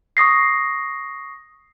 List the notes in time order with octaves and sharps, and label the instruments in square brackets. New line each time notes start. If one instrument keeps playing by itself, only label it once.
[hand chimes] C#6 D#6 A#6 C7